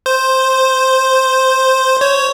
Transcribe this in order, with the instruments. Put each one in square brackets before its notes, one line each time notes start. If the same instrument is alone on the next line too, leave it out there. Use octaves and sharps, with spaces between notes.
[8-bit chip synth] C5
C#5